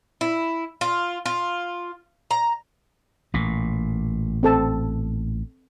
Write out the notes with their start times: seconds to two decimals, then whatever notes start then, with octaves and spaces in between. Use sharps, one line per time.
0.21 E4
0.81 F4
1.26 F4
2.31 A#5
3.34 A1 A#2
4.43 C4 A4 A5